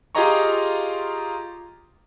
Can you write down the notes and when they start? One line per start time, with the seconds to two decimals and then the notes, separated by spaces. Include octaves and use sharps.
0.15 F4 G4 G#4 D#5 A#5 C#6